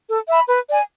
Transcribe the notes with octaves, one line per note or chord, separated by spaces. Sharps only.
A4
E5 B5
B4
D5 G#5